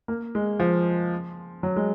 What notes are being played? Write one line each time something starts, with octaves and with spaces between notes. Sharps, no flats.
A#3
G#3
F3
F#3
G#3